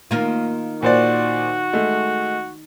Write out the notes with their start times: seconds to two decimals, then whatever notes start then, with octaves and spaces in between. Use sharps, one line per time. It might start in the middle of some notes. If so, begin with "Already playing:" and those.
0.11 D#3 A#3 F4
0.83 A#2 F#4 C5 D5
1.73 G#3 A3